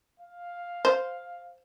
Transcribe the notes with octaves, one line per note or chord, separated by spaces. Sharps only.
F5
C5